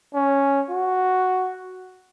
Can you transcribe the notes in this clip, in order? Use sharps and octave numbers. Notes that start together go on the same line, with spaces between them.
C#4
F#4